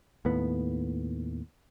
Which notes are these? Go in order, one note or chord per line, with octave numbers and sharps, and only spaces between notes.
D#2 A2 B3